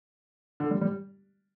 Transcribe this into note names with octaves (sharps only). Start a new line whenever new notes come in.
D3
G3
G3